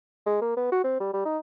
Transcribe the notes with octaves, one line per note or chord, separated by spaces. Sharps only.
G#3
A#3
B3
F#4
C4
G3
G3
D#4